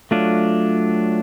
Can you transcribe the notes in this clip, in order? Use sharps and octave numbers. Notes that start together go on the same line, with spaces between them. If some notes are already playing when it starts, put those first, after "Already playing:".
F#3 A3 D4 F4